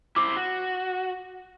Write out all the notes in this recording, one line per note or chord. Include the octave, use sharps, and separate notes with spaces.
E4 C5 D6
F#4